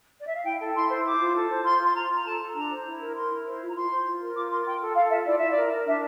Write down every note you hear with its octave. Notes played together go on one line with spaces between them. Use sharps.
D5
E5
F5
E4 G5
A4
E4 C6
C5
C5 D6
F4
A4
C5
F4 C6
F4 C6
F4 A#5
F4
A#5
A4 A5
A4
D4 A#5
C5
E4
A#4
A#4 C6
E4
C5
F4
A#5
F4 C6
C5
F4
A#4
F4 D6
A#4 C6
F4 G5
A4
A4 F5
F4 E5
E4 D5
E4 E5
A#4 D5
A#4
D4 E5